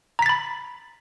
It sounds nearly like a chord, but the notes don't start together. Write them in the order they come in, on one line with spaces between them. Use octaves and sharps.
A#5 B6 A6 B5